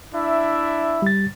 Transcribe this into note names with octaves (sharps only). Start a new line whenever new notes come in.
D4 E4 E5
G3 A6